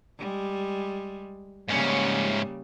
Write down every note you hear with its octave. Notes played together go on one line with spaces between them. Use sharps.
G3 G#3
G#2 C#3 G3 A#3 C#4